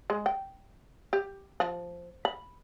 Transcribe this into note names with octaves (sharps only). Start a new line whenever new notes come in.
G#3
G5
G4
F3
B5